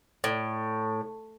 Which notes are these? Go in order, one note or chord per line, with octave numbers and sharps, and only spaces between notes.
A2